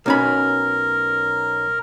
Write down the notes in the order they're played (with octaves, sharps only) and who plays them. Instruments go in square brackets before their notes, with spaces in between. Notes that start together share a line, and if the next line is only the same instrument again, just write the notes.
[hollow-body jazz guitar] B1 C#4 B5 [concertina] A#4